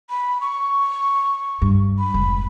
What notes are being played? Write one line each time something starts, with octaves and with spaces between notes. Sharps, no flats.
B5
C#6
G2
B5
F1 G#2